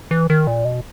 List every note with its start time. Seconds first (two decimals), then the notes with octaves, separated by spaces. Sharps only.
0.11 E3
0.30 D#3
0.47 A#2
0.65 B2